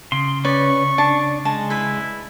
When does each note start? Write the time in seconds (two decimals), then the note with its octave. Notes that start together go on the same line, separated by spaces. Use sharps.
0.12 C#3 C6
0.45 C#4 B4 C#5 D5 C#6
0.98 D4 D5 A5
1.45 G#3 A5
1.70 E4 B4 B5